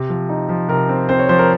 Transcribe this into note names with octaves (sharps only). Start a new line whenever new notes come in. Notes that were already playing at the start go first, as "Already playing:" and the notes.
Already playing: C3
F3
D#4
F3
C3 A#4
C4
C4 C5
C#5
F3 C5
A#4